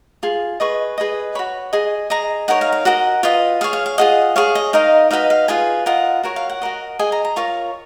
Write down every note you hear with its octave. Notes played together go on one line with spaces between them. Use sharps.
F4 G#4
G#4 B4 D#5 C#6
G#4 B4 D#5
F#4 C#5 B5
G#4 D#5
G#4 D#5 A#5
D#4 A#4 C#5 F#5
F5
F5
F#4 A#4 D#5 F#5
F4 B4 D#5
G#4 C#5 F5
F5
F5
F4 G#4 D#5 F#5
G#4 C#5 F5
D#5
D#4 A#4 D#5 F5
D#4 F#4 B4 D#5 F5
F5
F4 G#4 B4 G#5
F4 A#4 D#5 F#5
F#4 A#4 C#5
F5
F#5
F#4 A#4 D#5
G#4 D#5 G#5
A#5
A#5
F4 A#4 C#5 C#6